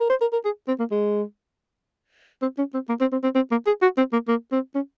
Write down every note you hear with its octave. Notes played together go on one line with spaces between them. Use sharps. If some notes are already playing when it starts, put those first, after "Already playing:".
A#4
C5
A#4
A#4
G#4
C4
A#3
G#3
C4
C#4
C4
A#3
C4
C4
C4
C4
A#3
G#4
F#4
C4
A#3
A#3
C4
C#4